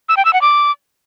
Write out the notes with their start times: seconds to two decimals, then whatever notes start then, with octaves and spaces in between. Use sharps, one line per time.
0.09 E6
0.17 G5
0.25 E6
0.33 F#5
0.42 D6